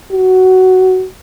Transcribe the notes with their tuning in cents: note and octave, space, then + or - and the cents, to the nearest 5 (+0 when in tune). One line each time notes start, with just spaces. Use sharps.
F#4 +10